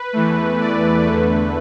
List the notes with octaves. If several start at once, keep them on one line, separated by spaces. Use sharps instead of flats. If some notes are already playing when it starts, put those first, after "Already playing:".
Already playing: B4
E2 E3 A3
D5
E2 D3 A3 B4